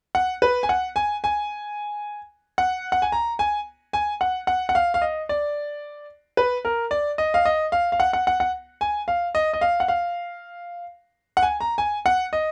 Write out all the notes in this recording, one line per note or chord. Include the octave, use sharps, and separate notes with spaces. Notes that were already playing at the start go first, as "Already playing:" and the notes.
F#5
B4
G#5
F#5
G#5
G#5
F#5
F#5
G#5
A#5
G#5
G#5
F#5
F#5
F#5
F5
F5
D#5
D5
B4
A#4
D5
D#5
F5
D#5
F5
F5
F#5
F#5
F#5
F#5
G#5
F5
D#5
D#5
F5
F#5
F5
F#5
G#5
A#5
G#5
F#5
D#5